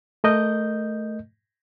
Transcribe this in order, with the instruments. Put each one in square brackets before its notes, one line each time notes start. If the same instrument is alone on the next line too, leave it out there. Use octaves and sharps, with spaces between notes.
[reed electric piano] A3 A#4 D#5 G6